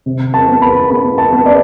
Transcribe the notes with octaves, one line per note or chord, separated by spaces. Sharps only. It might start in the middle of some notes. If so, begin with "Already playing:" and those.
C3
A5
B3
B5
B3 B5
A5
B3
D5